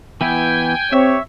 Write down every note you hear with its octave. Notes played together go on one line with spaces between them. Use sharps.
E3 B3 E4 G5 G#5
C4 G4 C#5 E5